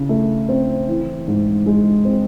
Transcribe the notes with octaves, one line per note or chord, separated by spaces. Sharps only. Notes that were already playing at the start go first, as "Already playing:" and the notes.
Already playing: C#3
A3
C4
E3
G#2
G#3
C4